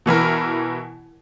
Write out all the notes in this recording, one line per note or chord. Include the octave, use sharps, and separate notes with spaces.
B2 E3 E4 A#4